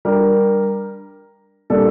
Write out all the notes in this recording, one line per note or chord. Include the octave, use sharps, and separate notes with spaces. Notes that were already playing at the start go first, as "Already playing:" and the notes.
G3 D4 G4 A#4
A#2 G3 D4 A4